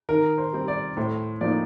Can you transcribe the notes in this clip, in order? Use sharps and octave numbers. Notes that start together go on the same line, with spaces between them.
D#3 A#4
C5
G3 C4
D5
A2 C5
F3 A#3 D#4 D5